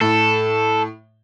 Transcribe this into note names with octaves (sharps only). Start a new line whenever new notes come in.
A2 A4